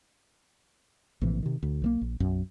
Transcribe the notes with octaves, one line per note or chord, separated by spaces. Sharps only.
A#1 A2 C3 E3
C3 D#3
D2
B1 E3 A#3
A#1
B1 F#2